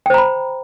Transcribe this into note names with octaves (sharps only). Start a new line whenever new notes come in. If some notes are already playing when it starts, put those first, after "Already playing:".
C5 G5 A#5 B5